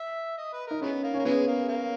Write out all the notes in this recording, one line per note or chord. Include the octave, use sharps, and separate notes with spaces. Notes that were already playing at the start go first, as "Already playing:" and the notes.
Already playing: E5
D#5
B4
D#4 A#4
E3 G#3 B3 C#4
A#3
C#4
A#3
C#3 E3 G#3 B3
A#3
A#3